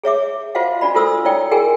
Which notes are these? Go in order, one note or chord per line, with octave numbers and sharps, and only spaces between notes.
G#4 C#5 E5 D6
F4 F#4 C5 D#5 F5 F#5
D4 F#4 D5 B5
F4 F#4 A4 C5 D#6 E6
E4 C#5 D5 G5
F#4 G#4 A#4 G5 G#5